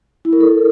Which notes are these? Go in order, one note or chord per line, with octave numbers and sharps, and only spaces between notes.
E4
A#4
A4